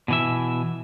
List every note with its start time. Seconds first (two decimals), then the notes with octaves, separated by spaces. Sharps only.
0.08 B2 E3 E5